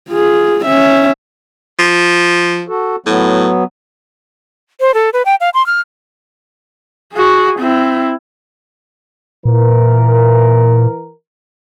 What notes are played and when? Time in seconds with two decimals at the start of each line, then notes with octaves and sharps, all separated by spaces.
0.10 F4 G#4
0.65 C#4 E5
1.79 F3
2.68 F#4 A4
3.06 A2 F#3 B3
4.80 C5
4.94 A4
5.13 B4
5.26 G5
5.41 F5
5.54 C6
5.66 F6
7.13 F#4 G#4
7.59 C4 E4
9.45 A#2 E3 A#4